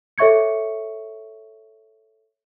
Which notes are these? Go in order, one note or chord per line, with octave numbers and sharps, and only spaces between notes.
A4 C#5 E5 C#6 G#6 C#7